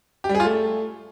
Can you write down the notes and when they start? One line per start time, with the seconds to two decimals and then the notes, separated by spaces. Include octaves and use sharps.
0.24 G4
0.29 G3
0.35 G#4
0.40 F4
0.45 A3